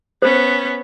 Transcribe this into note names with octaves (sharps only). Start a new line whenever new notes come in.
B3 C#4 C5